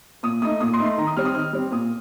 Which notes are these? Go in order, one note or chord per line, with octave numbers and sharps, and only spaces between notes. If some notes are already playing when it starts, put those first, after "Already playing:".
A#2 D#6
A3 D#4 D#6
A#2 D#6
C6
A3 D#4
C6
D#3 A#5
D#6
G3 C4 F6
D#6
D#3 F6
G3 C4
A#2 D#6